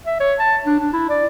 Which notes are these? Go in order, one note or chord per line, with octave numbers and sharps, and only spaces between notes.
E5
C#5
A5
D4
D4
E4
D5